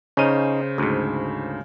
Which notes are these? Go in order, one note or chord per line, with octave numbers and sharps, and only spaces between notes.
C#3 C#4 D#4 C5 D#7
D2 G#2